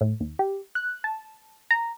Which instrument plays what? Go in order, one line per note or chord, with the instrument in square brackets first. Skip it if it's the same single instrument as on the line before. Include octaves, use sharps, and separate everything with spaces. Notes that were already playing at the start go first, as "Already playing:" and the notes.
[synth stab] A2
D#2
G4
F#6
A5
A#5